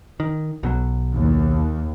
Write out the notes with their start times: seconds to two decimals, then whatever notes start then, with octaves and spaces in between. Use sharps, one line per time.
0.20 D#3
0.63 B1 B2 F#3
1.14 D#2